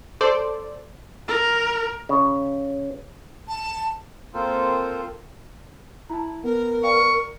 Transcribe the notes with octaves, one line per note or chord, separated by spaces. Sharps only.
A4 C5 D5
A#4
C#3
A5
A#3 C4 F4 A4 A#4 C5
E4 A5 A#5
B3 A#4
D5 F5 G5 C#6